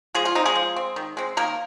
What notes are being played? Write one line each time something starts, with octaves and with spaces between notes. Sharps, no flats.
F3 G#3 G#4
F4
C4 D#4
G#3 G#4
F3
C4
D#3
G#3 C4
D#3 A#3 A#4